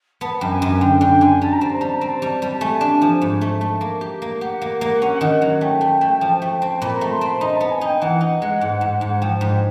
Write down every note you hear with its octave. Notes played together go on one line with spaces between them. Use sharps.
B3 A5
F#2 G5
G#5
F#2
D3 G5
D3 G5
D3 G#5
G3 A5
A#5
C4 A5
A#5
G3
A5
C4 A#5
A5
G3
G3
A5
A3 G#5
D4 A5
G#5
F3
G#2
A3
A3
A#3
G4
A#3
G4 F#5
A#3
A#3
C#4
D#3
F#3
A3 G5
A3
A3
F3
A3
C4
A#2 B5
A#5
A3
C6
C4 B5
D#4 A#5
B3 A5
G#5
D#4 G5
G5
E3 F#5
D#4
G#3
G#2
G#2
G#2
F#5
F3 G5
G#2